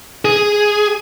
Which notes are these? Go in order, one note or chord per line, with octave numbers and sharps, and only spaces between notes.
G#4